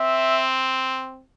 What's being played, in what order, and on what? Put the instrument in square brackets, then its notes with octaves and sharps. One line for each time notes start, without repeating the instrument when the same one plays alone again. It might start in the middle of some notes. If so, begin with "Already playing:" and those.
Already playing: [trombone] C4 [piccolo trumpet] E5